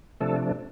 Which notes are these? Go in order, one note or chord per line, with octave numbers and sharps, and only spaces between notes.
C3 F3 A3 D4 A4